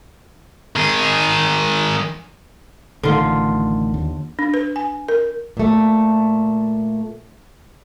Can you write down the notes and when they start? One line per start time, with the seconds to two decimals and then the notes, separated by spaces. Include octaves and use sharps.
0.76 D#3 G#4
3.03 A1 D3 D#3 A3 F4
3.94 D#2
4.39 D4
4.54 B4
4.76 G#5
5.08 A#4
5.57 A#2 A3